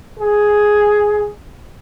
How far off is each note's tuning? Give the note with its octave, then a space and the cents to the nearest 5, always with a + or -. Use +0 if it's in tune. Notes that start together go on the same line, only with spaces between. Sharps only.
G#4 +5